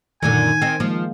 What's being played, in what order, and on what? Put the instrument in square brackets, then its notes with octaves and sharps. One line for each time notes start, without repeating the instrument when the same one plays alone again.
[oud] F#2 A#2 D3 [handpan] D#3 [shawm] G#5
[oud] D#3 C4
[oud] F3 [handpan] G#3 A#3